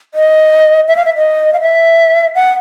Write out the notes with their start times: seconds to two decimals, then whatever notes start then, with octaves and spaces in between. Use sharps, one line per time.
0.14 D#5
0.88 E5
0.96 F5
1.06 E5
1.16 D#5
1.53 F5
1.61 E5
2.35 F#5